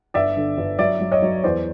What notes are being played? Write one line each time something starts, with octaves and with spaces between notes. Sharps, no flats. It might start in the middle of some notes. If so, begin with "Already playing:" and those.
G1 D5 E5
D3
G1
F#3 D5 E5
F#3
C#5 D#5
F#3
E2 C5 D5